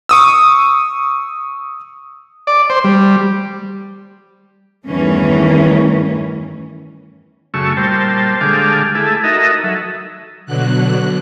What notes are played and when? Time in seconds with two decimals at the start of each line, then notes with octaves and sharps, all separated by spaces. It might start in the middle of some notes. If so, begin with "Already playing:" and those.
0.09 C#6 D#6 E6
2.47 D5
2.70 C5
2.84 G3
4.88 E2 G2 D#3 E3 A3 C#4
7.54 F#2 C#3 A3 C#6 E6
7.77 A#2 G3 C5 A5
8.41 D3 G#3 G4 A4 F5 D6
8.95 A3 E4 G#4 A4
9.24 D#4 F#4 A4 A#4 D#5 E5
9.64 F#3 A4 E5
10.46 B2 D3 F#3 F#6